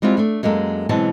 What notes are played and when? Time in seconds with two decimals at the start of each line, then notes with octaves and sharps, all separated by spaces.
0.02 G3 G#3 C4 E4 F4 G4
0.18 A3 D4
0.43 F#2 G#3 A#3 A4
0.89 B2 E3 F#3 G#3 C4 A5